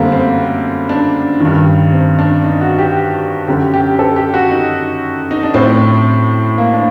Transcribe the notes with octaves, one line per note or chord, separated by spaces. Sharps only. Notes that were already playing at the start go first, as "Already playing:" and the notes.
Already playing: F#2 D3 G3 A3 A#3 C4
C4
D4
G2 D#3
C4
D4
D#4
F#4
G4
F#2 D3 G4
G4
A4
G4
F#4
D#4
D#4
D4
A2 C4
A#3
D4